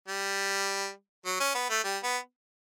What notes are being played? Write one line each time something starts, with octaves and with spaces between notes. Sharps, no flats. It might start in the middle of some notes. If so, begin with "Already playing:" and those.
G3
F#3
C#4
B3
A3
G3
B3